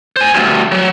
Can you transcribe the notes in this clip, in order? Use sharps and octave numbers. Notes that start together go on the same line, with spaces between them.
C5 G#5
D2 G2
F#3